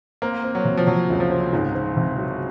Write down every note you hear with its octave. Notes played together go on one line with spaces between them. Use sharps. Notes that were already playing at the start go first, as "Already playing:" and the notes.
A#3 C4
C4
F#3
C3
F3
C3 F#3
C#2
F3
C4
C#2 G#2
C4
C3
F#3